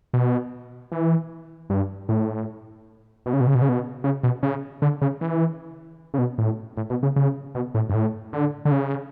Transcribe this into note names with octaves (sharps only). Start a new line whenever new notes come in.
B2
E3
G2
A2
B2
C#3
B2
C#3
B2
C#3
B2
C#3
B2
C#3
D3
C#3
E3
C#3
B2
A2
A2
B2
C#3
C#3
B2
A2
G2
A2
D3
D3
C#3